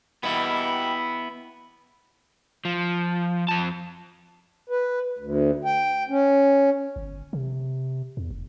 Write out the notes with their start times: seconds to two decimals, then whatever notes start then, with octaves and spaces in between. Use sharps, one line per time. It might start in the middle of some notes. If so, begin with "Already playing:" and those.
0.23 B2 G3 A#3 B3 E4
2.65 F3
3.48 F2 A5
4.69 B4
5.19 D2
5.65 G5
6.09 C#4
6.96 G1
7.33 C3
8.17 E2
8.31 F1